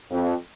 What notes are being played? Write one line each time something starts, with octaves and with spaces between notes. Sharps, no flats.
F2